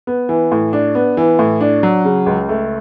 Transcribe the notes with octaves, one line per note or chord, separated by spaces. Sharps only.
B3
E3
A2
D4
B3
E3
A2
D4
F#3
C#3
C#2
A3